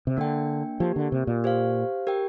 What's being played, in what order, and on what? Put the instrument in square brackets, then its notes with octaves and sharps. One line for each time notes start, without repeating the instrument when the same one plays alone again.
[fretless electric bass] C3
[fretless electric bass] D3 [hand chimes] A#3 D4 A#4 G5
[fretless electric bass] F3 [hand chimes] A#3 G4 A#4
[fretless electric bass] D3
C3
A#2
[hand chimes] G4 C5 F5
G4 A#4 G5